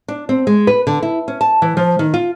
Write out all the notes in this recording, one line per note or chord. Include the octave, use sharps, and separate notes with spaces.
D4
C4
G#3
B4
D3
E4
C#4
A5
E3
F3
D#3
F4